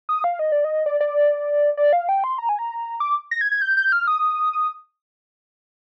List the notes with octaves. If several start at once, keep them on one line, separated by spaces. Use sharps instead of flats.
D#6
F5
D#5
D5
D#5
D5
D5
D5
F5
G5
C6
A#5
G#5
A#5
D6
A#6
G#6
G#6
G6
G6
F6
D#6
D#6